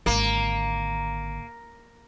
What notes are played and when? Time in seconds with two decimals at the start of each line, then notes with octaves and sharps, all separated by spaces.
0.06 G#1 D3 A#3